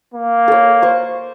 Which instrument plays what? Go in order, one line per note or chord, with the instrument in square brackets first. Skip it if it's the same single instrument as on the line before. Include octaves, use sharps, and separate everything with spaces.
[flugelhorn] A#3
[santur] A4 C#5
C5 C#6